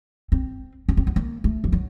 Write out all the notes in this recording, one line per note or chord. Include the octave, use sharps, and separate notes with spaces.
C4
C#4
C4
B3
A#3
A3
F3
F#3